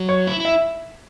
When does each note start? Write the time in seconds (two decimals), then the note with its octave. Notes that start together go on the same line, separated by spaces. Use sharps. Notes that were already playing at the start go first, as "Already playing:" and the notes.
Already playing: F#3
0.09 C#5
0.27 E4
0.40 E4
0.45 E5